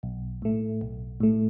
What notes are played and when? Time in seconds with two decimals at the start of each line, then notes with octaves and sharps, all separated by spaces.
0.03 B1
0.42 A2 A3
0.81 B1
1.20 A2 A3